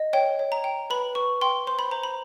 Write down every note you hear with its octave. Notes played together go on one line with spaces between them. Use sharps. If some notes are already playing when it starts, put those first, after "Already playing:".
Already playing: D#5
C#5 G5
C#5
A#5
G5
B4 B5
B4 C#6
G5 C6
C5 C6
B5
C5 A#5
B5